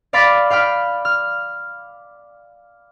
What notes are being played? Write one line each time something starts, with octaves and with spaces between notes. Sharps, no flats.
D5 F5 B5 D6 A6 B6
F5 G5 B5 F6
F6